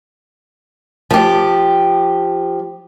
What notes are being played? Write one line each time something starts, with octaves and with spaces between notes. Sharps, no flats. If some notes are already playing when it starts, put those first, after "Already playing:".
F3 G4